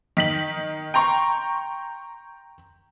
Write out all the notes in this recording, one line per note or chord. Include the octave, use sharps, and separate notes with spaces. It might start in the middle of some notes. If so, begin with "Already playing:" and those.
D#3 B6 F#7
G5 A#5 C6 C#6